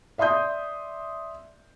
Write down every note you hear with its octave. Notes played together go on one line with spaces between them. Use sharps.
D5 E5 C6 D#6 G6